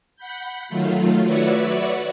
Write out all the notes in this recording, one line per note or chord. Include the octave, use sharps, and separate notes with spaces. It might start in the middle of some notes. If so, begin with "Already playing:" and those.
F#5 B5 G6
D#3 F#3 A3 F4
F#4 B4 C#5 D5 E5 F#5